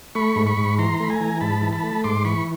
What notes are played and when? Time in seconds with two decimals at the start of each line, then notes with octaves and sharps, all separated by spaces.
0.15 A3 B5 C#6
0.36 G#2
0.46 B5 C#6
0.57 G#2
0.79 E3 A#5 C6
1.00 A3 B5
1.10 G#5 A#5
1.21 E3
1.41 G#2 A5 B5
1.62 E3
1.72 A5 B5
1.83 A3
2.04 G#2 C6 D6
2.25 E3 B5 C#6